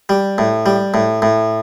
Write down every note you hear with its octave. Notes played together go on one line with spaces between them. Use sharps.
G3
A2
G3
A2
A2